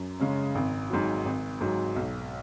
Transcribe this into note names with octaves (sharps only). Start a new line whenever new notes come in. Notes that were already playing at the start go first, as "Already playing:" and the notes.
Already playing: F#2
C#3 G#3 C#4
G#1
G#2 F#3
G#1
G#2 F#3
B1